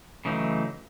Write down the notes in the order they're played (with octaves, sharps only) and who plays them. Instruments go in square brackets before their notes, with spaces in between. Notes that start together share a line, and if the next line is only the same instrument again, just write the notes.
[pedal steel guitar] C#3 E3 F#3 A3 D#4